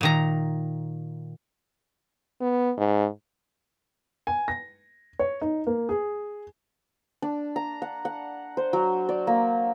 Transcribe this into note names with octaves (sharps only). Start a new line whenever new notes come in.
A#2 D#3 A#5
B3
G#2
G#5
A#6
C#5
D#4
A#3
G#4
D4
A#5
F#5
F#5
C5
F#3
D5
A#3